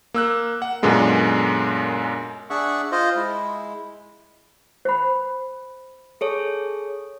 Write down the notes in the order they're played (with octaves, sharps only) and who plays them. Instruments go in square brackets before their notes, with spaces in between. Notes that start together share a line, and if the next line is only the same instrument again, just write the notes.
[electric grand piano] A#3 E6 F#6
F#5
F#2 A#2 D3 G#3 B3
[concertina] D4 G#4 E5 F#5 C#6
F4 C5 D#5
G#3 E4
[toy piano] C5 B5
[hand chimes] G#4 A4 C#5